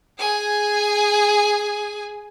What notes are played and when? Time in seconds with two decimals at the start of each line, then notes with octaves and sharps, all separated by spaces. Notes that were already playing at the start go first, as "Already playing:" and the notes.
0.18 G#4 G#5